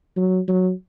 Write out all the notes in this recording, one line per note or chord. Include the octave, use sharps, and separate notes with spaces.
F#3
F#3